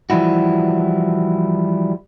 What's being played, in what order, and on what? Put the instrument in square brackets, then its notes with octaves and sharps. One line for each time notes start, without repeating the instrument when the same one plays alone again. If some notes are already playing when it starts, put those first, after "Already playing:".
[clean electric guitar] E3 F3 G3 E4 F#4